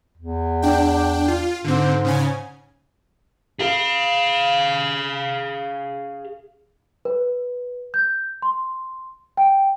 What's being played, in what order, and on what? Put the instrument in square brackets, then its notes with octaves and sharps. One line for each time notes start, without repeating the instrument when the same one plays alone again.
[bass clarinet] E2
[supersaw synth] D4 G5
F4
[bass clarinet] G#2 [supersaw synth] D3 C4
[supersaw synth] C#3 C#4 G#5
[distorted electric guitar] G#4 F5
[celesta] B4
G6
C6
G5